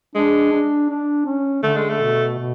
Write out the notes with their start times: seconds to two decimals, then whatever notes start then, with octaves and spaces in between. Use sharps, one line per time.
0.15 G#3 D4
0.52 D4
0.89 D4
1.26 C#4
1.63 D3 A3
1.76 G#3
1.90 A3
2.01 B2
2.38 B2